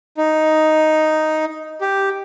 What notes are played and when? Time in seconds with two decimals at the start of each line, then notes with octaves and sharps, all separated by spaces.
0.17 D#4
1.81 G4